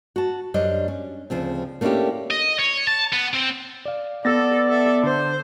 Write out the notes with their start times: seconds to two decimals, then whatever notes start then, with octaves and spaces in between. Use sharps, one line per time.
0.16 F#4 A5
0.54 F#2 G3 D4 C5 D#5
0.88 C#4
1.30 D2 C#3 F3 C4
1.81 A3 A#3 C#4 D4 E4 G4
2.31 D#5
2.59 C#5
2.87 A5
3.12 B3
3.34 C4
3.85 D5 F5
4.25 B3 A4 D5 E6 A6 A#6
4.69 A4 E5
5.03 D3 C5